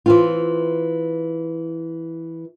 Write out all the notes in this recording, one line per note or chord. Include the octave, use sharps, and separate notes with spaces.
E3 C4 F4